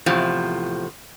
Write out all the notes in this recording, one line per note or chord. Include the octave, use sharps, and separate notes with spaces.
E2 A2 C3 F3